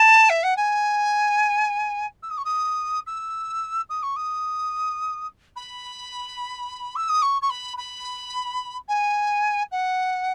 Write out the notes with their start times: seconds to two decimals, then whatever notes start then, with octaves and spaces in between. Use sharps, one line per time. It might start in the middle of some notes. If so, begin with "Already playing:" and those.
Already playing: A5
0.29 E5
0.43 F#5
0.56 G#5
2.23 E6
2.30 D#6
2.37 C#6
2.45 D#6
3.07 E6
3.89 D#6
4.03 C#6
4.16 D#6
5.56 B5
6.96 E6
7.09 D#6
7.22 C#6
7.42 C#6
7.50 B5
7.77 B5
8.88 G#5
9.71 F#5